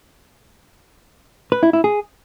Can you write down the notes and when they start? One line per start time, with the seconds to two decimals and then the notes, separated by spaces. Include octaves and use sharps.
1.52 B4
1.63 E4
1.73 E4
1.84 G#4